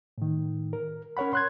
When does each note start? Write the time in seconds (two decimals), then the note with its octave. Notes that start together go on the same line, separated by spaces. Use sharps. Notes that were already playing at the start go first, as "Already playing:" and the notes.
0.18 A2 D#3
0.73 A#4
1.17 C#4 A#4 C#5 F#5 B5
1.33 C6 F#6 G#6